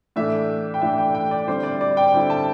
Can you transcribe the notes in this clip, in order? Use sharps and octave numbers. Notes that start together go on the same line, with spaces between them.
A2 E3 A3 D4 E5
G5
A2 E3 A3 D4 E5
G5
G5
D5
D3 G3 C4 E4 C5
D5
D5
G5
D3 G3 C4 E4
A5